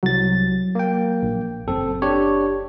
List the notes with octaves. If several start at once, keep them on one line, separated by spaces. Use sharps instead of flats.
C2 F#3 A6
A#3 G5
A#1
F#1 C4 A4
D4 G4 C#5